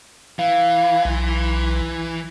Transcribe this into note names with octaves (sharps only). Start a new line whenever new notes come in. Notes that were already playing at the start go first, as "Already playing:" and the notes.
E3 F5
B1